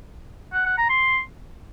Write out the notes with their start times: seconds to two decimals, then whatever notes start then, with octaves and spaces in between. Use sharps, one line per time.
0.54 F#5
0.66 F#5
0.78 A#5
0.89 C6